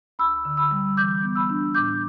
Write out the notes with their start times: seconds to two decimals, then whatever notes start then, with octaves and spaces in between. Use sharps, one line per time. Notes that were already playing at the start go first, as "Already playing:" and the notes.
0.19 D2 B5 E6
0.45 D3
0.57 B5 E6
0.71 G3
0.96 E3 D6 G6
1.22 B3
1.35 B5 E6
1.50 D4
1.75 A2 D6 G6